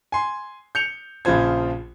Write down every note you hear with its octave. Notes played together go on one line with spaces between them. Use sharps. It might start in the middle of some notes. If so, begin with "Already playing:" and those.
G#5 C6
G6 C#7 F7
A#1 C#3 F3 F4 C5 G#6